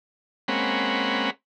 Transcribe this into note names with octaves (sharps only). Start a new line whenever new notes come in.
G#3 A#3 C4 C#4 F#5 B5